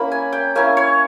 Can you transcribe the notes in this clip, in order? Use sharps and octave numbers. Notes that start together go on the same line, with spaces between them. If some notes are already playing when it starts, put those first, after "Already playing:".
Already playing: A#3 C#4 E4 B5
G#5
G5
A#3 C#4 E4 G#5
C#5